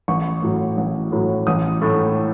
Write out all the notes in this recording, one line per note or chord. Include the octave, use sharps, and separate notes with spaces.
A1 C#6
A2 F#3
A1
A2 F#3
A1 D#6
A2 A3